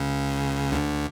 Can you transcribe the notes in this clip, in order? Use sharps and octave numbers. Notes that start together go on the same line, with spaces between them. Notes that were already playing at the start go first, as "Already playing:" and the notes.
Already playing: C#2 C#3
D2 D3